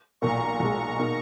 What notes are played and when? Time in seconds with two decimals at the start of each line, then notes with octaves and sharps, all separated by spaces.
0.21 B1 A#2 A#3 A#5 C#6
0.59 B1 A#2 G#3
0.98 B2 A#3 D#4 A#4